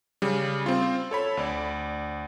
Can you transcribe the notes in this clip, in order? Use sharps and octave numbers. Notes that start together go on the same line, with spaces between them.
C#3 G3
C4 F4
A4 C#5 B5
D2 D5